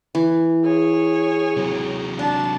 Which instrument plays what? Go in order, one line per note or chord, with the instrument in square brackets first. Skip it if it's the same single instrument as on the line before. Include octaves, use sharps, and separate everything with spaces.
[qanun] E3
[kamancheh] G#4 C#5
[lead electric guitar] C3 F#3
[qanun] D4 [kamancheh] A5